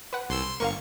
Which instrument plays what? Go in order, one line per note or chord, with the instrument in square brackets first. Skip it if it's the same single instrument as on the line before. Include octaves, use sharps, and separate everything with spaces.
[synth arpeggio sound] B4 F#5
[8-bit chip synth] C2 C6 E6
C6
[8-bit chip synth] G1 C#6 [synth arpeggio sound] A#3 A#4 F5